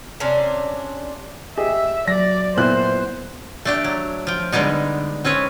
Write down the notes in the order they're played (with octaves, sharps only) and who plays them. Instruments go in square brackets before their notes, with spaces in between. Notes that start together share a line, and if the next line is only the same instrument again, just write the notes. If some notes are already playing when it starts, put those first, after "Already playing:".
[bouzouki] C3 C#4 D4 C5
[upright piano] G4 G#4 D#5 [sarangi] E5
[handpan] F#3 [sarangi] D5 [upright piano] A#6
[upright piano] A#2 E4 F#6 [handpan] B3 [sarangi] C5
[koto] A3 D4 G4
F#3
F3 G5
D3 G3 G#3 B3 D#4
C4 C#4 B4 C#5